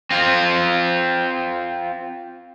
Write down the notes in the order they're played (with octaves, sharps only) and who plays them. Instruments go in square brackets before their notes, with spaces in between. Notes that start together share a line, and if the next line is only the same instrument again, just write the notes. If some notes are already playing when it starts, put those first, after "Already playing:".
[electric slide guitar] C4 F4